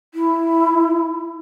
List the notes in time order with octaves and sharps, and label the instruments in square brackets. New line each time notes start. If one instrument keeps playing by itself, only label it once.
[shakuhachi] E4